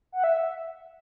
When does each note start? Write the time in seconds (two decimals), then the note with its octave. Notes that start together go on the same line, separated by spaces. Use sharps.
0.12 F#5
0.24 E5